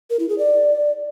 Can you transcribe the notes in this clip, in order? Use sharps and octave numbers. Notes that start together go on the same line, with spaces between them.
A#4
E4
G#4
D5